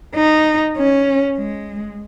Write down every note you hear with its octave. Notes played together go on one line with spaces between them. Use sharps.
D#4
C#4
G#3